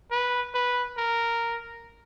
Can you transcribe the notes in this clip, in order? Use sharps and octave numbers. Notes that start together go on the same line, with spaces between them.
B4
B4
A#4